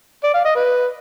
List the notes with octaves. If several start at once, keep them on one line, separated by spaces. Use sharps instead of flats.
D5
F5
D#5
B4